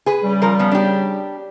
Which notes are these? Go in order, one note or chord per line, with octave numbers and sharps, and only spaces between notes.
G#4 B4
C#3 G3
F3 A#4
F3 B3
D4 G4